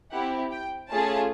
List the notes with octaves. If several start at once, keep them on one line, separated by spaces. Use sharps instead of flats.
C4 E4 G4 F#5
G5
A3 C#4 F4 G#4 A5